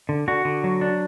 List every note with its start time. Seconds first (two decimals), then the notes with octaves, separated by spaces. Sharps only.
0.09 D3
0.28 D3 F#4
0.45 D3
0.64 F#3
0.81 D4